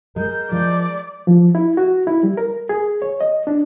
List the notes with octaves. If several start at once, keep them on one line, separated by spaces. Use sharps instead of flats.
G#3 A#4 G6
F3 G#3 D5
F3
E4
F#4
E4
G3
A#4
G#4
C#5
D#5
D4